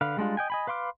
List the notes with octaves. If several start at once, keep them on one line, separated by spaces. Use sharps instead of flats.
D3 B4 F5
G3 G#3 D4 F4
D#5 G5 G#5
D#5 G#5 B5
B4 F5 C6 D6 F6